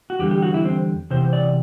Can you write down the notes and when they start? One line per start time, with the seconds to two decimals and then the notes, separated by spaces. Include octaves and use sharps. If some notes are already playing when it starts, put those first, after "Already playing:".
0.10 F#4
0.19 E2 D3 G3 G4
0.31 G4
0.42 F#4
0.54 E4
0.65 C4
1.10 E2 C3 C5
1.33 D5